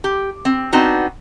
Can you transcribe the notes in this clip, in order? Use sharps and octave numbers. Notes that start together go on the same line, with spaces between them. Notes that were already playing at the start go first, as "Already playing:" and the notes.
G4
C4
B3 C4 D4 D#4 F#4